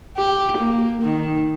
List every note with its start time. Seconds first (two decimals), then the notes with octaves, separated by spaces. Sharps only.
0.17 G4
0.57 A#3
1.02 D#3